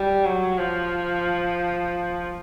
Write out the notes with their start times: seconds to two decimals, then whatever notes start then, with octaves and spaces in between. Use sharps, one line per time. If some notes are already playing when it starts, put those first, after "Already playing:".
Already playing: G3
0.25 F#3
0.58 F3